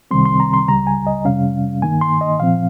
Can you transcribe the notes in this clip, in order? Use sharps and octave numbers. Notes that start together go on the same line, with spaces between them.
C2 C3 D#3 G3 C4 C6
C6
A#5
C6
C#2 C#3 G3 A#5
G#5
D#5
F2 C3 G3 C#4 F5
G2 D#3 A#3 D#4 G#5
C6
D#5
A#2 F3 C4 F5